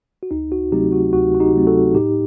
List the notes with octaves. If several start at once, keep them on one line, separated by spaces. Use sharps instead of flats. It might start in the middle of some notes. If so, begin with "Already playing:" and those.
F#4
D2 D#4
F#4
C3 F#3 A3 C4 D#4 G4
F#4
D2 F#4
F#4
D#4 G4
C3 F#3 A3 C4
F#4 A4
A2 D#4 G4